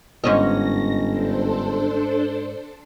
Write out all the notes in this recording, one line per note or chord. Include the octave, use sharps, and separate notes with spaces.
G1 G#2 C#4 D#5 A#6
D4 A4 C5